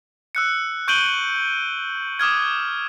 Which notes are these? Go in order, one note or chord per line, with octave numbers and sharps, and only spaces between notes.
E6 F#6 C#7
C#6 G6 D7 D#7 F#7 G7
D6 D#6 F6 G#6